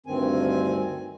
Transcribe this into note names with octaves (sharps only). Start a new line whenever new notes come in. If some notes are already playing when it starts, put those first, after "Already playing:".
D2 G2 D#3 C4 G#5